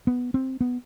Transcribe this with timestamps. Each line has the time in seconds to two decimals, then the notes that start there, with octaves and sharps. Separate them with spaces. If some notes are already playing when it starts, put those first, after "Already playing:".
0.07 B3
0.34 C4
0.61 B3